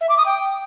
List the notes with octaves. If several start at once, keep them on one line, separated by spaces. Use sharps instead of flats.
E5
D6
D#6
G5